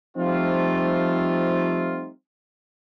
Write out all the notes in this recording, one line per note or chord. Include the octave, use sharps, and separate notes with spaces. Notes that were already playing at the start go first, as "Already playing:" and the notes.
F3 G3 A3 C4 D#4 F4